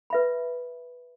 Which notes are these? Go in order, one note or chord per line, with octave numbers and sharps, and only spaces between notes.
B4 E5 B5